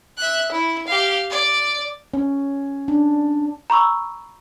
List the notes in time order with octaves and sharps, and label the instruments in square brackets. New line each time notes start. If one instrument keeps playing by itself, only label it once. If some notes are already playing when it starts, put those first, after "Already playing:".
[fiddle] E5 F#6
E4
G4 F5
D5
[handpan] C#4
D4
[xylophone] A#5 B5 C#6 E6